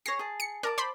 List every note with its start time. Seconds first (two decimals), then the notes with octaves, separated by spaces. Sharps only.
0.06 G#4 C#5 A#6 C7
0.19 G#4 A5
0.40 C#7
0.63 A#4 D5 A5 D6
0.78 C5 B5 C6